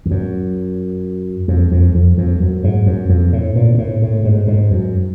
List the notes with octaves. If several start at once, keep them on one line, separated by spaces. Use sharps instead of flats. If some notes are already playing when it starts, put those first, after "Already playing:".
F2
F#2
F2
F2
F2
F2
F#2
G#2
F#2
F2
A2
A#2
A#2
A2
A2
G#2
G#2
F#2